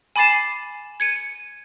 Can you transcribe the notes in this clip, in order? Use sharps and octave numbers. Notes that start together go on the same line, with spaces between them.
G#5 B5 D6 A6 C7 E7
G#6 C#7 D#7